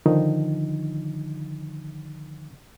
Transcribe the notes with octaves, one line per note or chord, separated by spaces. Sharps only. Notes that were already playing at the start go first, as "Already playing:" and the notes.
D3 D#3 F3 D#4